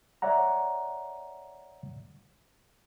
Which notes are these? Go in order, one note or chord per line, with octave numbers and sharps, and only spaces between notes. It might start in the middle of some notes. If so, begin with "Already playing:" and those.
C#5 D5 E5 F#5 A#5